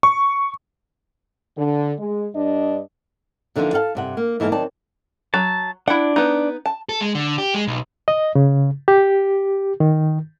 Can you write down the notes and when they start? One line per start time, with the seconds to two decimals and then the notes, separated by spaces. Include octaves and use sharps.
0.03 C#6
1.57 D3
1.99 G#3
2.35 G2 D4 D#5
3.56 D#2 D3 E3 F3 D4 F4
3.73 A4 F5 F#5 A5
3.95 G2 C3 F#5
4.17 A#3
4.40 G#2 E3 A#3 A4 A#4
4.52 D#3 F#3 C4 D5 A5
5.34 F#3 A5
5.88 D4 E4 F#5
6.16 B3 D#4
6.66 A5
6.89 A4
7.01 G#3
7.15 D3
7.38 G4
7.54 G#3
7.67 B1
8.08 D#5
8.35 C#3
8.88 G4
9.80 D#3